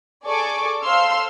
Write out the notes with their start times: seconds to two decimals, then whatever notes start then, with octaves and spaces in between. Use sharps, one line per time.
0.25 G#4 A4 D5 G#5 C#6 D6
0.84 A4 C5 F5 C6 E6 F6